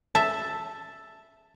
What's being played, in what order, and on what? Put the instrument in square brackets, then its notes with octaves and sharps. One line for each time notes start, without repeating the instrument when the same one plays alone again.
[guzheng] E5 [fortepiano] A5